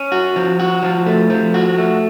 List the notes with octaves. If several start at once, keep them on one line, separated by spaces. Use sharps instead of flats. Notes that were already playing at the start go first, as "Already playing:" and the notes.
Already playing: C#4
F#4
F3
F#4
F3
A3
F3
F#4
A3